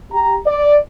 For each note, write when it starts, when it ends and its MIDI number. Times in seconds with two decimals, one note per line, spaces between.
0.12 0.36 67
0.12 0.36 82
0.47 0.78 74